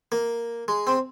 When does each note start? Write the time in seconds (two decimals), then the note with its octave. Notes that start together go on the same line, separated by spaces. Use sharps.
0.12 A#3
0.68 G#3
0.87 C4